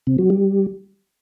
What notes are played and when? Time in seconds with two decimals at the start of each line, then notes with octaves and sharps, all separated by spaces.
0.07 C3
0.18 F#3
0.30 G3